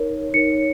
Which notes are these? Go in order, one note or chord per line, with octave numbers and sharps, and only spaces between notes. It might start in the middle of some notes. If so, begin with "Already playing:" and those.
Already playing: D#4 A#4 C#5
D#4 A#4 C#5 C#7